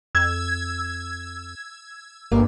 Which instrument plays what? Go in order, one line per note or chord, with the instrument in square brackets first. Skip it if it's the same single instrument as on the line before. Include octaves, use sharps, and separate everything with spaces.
[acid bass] F2 [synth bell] E6 G#6
[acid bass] G1 [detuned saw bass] G2 [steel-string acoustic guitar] A#3